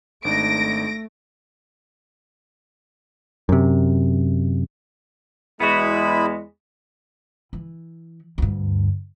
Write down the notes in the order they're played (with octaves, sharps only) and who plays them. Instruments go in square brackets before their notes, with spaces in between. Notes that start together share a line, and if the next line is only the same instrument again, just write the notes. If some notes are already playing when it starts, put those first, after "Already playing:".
[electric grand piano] G#1 D4 D#4 [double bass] A3 [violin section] A#6 D7
[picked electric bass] F#2 C3
[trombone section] E2 G#3 [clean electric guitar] B3 F#4 [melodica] E4 B5
[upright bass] E3
D2 G2